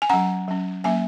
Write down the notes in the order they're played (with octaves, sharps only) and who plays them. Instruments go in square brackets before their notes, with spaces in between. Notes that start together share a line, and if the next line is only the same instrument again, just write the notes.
[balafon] G#5
F#3 C#4 F#5 A#5
F#3 C#4
F#3 A#3 C#4 E5 G#5